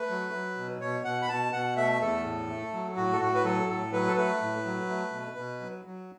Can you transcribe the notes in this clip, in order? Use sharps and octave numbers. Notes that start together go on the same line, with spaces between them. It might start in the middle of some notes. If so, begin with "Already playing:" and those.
Already playing: A3 B4
F#3
F#3
B2
B2 C#5
B2 F#5
B5
B2 A5
B2 F#5
A3 E5
E2 A4
A2
A3
F#3
A2 F#4
A4
A2 F#4
B4
F#3 A4
A2 A4
F#3 B4
A4
A3 B4
A2
F#3
A3
B2
B2
F#3
F#3